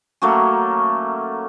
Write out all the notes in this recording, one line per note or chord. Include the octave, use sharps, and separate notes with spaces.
F#3 A3 A#3 C#4